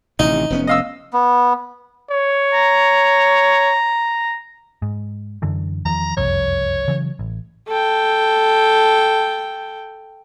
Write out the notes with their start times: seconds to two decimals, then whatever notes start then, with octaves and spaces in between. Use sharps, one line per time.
0.19 A1 C3 D#3 D#4
0.50 F1 B3 C#4
0.67 D#5 F5 E6
1.13 B3
2.11 C#5
2.53 A#5
4.82 G#2
5.42 F#2 D3 E3
5.85 E2 D#3 F3 A#5
6.17 F#1 C2 F2 C#5
6.88 C#3 E3 F#3
7.19 A1
7.68 A4 G5